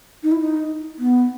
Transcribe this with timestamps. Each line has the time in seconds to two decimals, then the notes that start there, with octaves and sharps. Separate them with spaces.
0.23 D#4
0.32 E4
0.40 D#4
0.99 B3